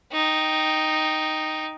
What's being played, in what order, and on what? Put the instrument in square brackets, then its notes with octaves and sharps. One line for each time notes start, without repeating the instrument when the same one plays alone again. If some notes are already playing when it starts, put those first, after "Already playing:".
[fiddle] D#4 G5